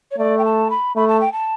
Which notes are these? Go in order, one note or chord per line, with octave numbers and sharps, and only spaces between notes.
C#5
A3 D5
G5
A5
B5
A3 B5
A5
G5
A5